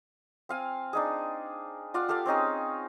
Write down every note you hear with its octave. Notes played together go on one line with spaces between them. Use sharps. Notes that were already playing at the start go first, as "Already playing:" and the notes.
C4 F5 G#5
D4 D#4 G#4
F4 D5 F5 F#5
G4 A4 D5 F5
C4 C#4 D#4 G#4